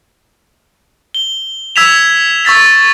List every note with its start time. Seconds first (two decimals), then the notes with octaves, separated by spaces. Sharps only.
1.14 G7
1.76 E6 G#6 B6 E7 F7
2.45 C#6 E6 A6 B6